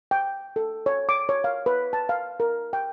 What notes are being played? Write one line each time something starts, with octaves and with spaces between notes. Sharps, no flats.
G5
A4
C#5
D6
C#5
F5
B4
A5
F5
A#4
G5